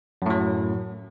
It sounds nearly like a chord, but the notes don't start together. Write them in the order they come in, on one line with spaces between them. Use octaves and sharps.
F#2 A2 F#3